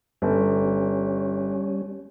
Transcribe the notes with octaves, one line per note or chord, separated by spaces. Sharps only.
G1 G3 C#4